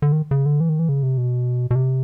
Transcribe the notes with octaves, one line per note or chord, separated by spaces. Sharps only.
D3
D#3
C#3
D3
E3
D#3
E3
C#3
C3
B2
B2
C3